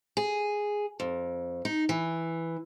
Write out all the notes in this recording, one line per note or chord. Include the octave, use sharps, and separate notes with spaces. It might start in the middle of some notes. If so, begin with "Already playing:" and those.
G#4
F2
D#4
E3